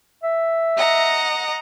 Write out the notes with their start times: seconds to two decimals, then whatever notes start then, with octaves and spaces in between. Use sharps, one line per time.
0.23 E5
0.77 D#5 F#5 A#5